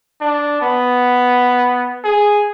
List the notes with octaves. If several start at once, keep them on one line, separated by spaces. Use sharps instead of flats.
D4
B3
G#4